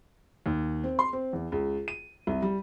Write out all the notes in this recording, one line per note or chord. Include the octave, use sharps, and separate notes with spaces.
D#2
C4
C6
C4
E2
C#2
D#7
C2
G3